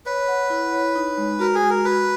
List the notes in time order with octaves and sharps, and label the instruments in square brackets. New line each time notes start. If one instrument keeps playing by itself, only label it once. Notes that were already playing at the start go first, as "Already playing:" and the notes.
[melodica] B4 [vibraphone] C#5
[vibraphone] F#5
E4
C#5
D#4
G#3
[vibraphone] F#4 [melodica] A#4
[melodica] G#4
[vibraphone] G#3
[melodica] A#4
[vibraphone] F#4 [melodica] B4